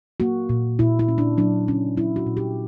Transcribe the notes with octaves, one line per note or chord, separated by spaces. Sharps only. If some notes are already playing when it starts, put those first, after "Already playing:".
A#3 F#4
A#2
A#2 E4
E4
C#4
D4
F#3 D4
F#3 C#4
F#3 E4
F#4
A#2
G4